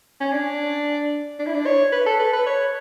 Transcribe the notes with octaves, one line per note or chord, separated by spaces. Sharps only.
C#4
D4
D4
E4
D4
C#5
B4
A4
B4
B4
C#5